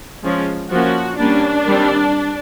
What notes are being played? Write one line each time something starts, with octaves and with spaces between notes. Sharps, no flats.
F3 G#3 C#4
F3 A#3 C#4 F#4
G3 A#3 C#4 D4
D#3 G3 C4